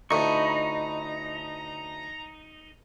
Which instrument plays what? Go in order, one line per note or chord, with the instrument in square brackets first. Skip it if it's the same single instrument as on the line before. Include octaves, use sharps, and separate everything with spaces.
[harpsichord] D2 A2 [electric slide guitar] D#4 [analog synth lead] A#5 [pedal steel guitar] B5 C#6